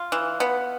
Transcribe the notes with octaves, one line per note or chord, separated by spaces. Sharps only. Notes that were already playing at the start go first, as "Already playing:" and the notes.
Already playing: F4
E3
B3